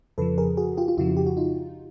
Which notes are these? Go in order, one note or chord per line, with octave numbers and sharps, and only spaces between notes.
F2 C#3 F3 A4 B4
G#4 A#4
F#4 G#4
F4 G4
F4
F2 C#3 F3 E4 F#4
G4
F#4
D#4 F4